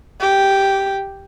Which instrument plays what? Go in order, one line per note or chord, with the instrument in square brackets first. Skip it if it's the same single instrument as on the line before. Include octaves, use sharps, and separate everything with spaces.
[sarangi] G4